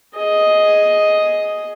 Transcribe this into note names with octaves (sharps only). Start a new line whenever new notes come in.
G#4 D#5